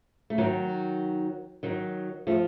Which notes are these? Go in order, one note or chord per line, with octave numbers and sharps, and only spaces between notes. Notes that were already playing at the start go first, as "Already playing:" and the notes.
A3
D#3 F#3
D#3 F#3
F3 A3